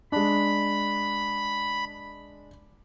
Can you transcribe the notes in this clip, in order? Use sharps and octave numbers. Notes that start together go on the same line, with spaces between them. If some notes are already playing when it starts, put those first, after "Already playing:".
G#3 D4 B5